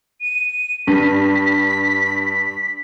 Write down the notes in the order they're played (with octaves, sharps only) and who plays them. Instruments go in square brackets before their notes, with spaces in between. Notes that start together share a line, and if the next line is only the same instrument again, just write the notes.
[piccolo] D#7
[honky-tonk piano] G2 [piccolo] B6